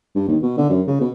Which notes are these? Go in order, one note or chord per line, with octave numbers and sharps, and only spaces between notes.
G2
D#2
B2
D3
F#2
C#3
B2